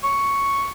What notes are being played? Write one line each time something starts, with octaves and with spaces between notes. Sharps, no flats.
C#6